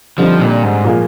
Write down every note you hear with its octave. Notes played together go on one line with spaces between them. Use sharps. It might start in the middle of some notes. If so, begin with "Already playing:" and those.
D3 F3 G3 C4 D#4
A#2
G#2
A#2 F3 A#3 F4 G#4